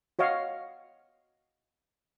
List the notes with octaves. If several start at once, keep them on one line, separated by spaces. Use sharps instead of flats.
F#4 C#5 D#5 F5